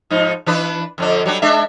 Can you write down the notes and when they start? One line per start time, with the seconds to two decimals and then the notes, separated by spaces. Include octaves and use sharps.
0.10 G#2 F3 D#4
0.46 E3 D4 B4
0.98 F2 D3 D4
1.25 F#3 G3 D4
1.42 G#3 D4 E5